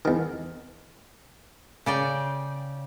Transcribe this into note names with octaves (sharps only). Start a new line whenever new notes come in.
E2 D#3
C#3 D5 G5